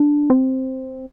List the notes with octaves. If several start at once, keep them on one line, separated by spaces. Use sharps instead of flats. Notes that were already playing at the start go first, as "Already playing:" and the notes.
Already playing: D4
C4